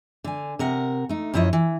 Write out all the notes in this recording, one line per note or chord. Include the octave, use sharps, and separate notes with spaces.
D3 G#5
C3 A#4 F#5
A3 D#4
F#2 F3 E4 C#5 D#5
E3